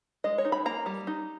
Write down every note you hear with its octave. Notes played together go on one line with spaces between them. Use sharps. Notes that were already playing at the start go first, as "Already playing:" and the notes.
G#3 D#5
C#5
D#4
B5
A#3 A#5
G3
D#4